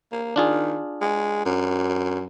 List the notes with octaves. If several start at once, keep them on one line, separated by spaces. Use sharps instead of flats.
A#3
D#3 D4 F4 G#4
G#3
F#2